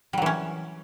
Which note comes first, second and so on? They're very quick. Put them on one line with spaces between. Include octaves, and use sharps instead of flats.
G3 F#3 E3 C#4